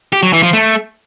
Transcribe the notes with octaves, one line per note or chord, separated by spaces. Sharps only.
G4
F#3
E3
F3
A3